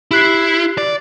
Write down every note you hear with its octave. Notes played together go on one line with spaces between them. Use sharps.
E4 G4 F#6 C7
D5